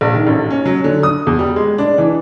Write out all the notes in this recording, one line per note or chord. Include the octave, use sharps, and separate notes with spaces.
A#1
D#3
A1
C#4
F#3
D3
D#6
E2
G3
G#3
D4
E3